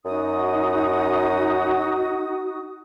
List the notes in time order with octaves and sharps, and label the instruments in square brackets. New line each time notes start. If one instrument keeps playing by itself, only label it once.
[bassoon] F#2 [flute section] D#4 F#4 D#6